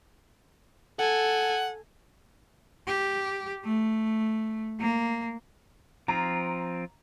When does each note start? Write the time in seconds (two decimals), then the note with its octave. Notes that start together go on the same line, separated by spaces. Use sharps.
1.00 A4 F#5 G#5
2.87 G4
3.64 A3
4.80 A#3
6.08 F3 C4 F4 A#5